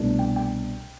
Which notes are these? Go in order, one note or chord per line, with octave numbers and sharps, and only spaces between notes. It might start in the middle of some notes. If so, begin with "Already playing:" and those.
Already playing: C2 B2 A3 D4
G5
G5